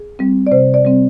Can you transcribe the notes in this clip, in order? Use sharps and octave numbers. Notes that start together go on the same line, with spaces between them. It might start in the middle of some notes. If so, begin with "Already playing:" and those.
Already playing: G#4
G3 C4
D5
C3 C5
D5
G3 C4